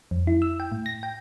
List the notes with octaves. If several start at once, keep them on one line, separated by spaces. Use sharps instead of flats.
F2
E4
E6
G5
A2
A#6
G5